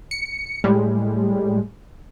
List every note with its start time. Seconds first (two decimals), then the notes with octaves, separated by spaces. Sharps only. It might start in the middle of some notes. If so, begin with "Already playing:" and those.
0.11 C#7
0.64 A2 G3 G#3